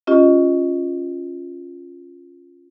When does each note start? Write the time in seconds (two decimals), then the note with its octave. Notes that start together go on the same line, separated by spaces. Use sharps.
0.07 C#4 F4 G4 D#5